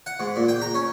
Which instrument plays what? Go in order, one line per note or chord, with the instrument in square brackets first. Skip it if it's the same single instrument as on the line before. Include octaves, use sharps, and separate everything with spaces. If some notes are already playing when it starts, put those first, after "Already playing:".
[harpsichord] F#5
G#2
A#2
G5
A#5
C#4